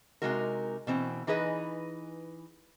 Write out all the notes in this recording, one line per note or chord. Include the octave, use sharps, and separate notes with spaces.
C3 F3 G#3 D#4 F#4 A#4
B2 E3 C4
E3 D#4 G#4 B4 D#5